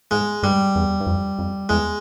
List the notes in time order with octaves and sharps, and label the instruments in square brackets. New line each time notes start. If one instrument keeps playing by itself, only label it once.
[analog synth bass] G#2 [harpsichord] G#3
[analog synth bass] G2 [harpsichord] G3
[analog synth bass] E2
G2
F2
F2
[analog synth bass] E2 [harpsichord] G#3